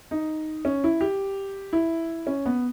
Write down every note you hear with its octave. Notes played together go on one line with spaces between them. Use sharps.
D#4
C#4
E4
G4
E4
C#4
B3